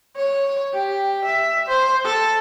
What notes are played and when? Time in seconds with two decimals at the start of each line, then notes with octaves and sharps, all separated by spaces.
0.16 C#5
0.73 G4
1.25 E5
1.69 C5
2.05 A4